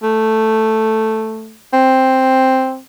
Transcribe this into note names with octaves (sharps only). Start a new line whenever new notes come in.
A3
C4